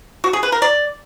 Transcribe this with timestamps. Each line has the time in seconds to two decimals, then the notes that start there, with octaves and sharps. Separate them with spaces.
0.24 F#4
0.33 G#4
0.43 B4
0.52 A#4
0.62 D5